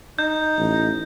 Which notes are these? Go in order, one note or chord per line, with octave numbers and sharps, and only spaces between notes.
D#4 G6
A1